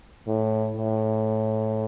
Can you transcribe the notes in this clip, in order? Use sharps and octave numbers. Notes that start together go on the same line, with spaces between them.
A2
A2